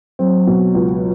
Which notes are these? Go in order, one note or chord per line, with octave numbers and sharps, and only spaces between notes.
F#3 C4
B2
C#2